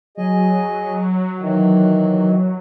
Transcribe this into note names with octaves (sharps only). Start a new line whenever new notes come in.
F#3 G#4 D#5
D#3 E3